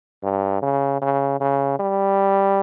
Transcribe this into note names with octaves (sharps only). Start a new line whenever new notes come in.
G2
C#3
C#3
C#3
G3